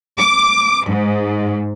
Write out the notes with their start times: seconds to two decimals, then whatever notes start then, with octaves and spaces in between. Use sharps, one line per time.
0.19 D6
0.86 G#2